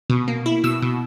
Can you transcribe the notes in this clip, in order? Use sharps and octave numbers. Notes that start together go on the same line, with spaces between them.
B2
A#3
E4
B2 E6
B2